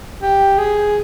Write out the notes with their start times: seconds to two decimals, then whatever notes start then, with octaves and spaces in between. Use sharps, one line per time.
0.21 G4
0.58 G#4